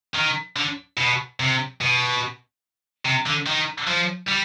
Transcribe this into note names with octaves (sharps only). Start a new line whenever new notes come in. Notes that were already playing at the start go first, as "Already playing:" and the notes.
D#3
D3
B2
C3
B2
C3
D3
D#3
F3
G3